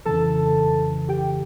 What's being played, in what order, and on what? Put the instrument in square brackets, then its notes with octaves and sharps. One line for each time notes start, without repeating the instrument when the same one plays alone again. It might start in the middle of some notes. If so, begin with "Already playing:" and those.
[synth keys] F2 C#3 E3 A4 A5
G4 G5